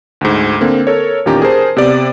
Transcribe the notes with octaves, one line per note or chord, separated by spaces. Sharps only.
D2 G#2
D3 A#3 C4
A4 A#4 C#5
E2 A#2 D#3 C#4 G4 A#5
G#4 A#4 C5 A5
C3 B3 G4 D5